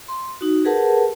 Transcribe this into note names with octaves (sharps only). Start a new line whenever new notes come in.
C6
D#4 F#4
G4 G#4 A#4 B4 F#5 A5